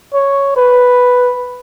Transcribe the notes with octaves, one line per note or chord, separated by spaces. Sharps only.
C#5
B4